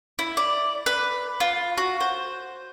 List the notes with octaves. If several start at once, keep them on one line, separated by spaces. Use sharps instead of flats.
E4
D5
B4
F4
F#4
C5